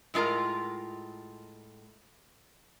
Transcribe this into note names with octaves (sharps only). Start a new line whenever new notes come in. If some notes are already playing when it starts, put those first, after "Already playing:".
A2 G#3 F4 A#4 A#5